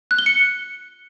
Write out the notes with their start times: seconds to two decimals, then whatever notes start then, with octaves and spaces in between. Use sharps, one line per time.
0.11 F#6
0.18 G7
0.26 C#7